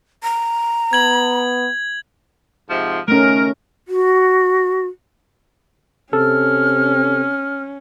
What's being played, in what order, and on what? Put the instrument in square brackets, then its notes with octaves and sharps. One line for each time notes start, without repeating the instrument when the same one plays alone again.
[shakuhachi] A#5
[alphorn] B3 [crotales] G#6 F#7
[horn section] G#2 C3 F3
[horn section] D#3 A#4 [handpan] A3 C#4
[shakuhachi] F#4
[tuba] C3 [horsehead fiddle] C#4 [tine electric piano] A4 [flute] F6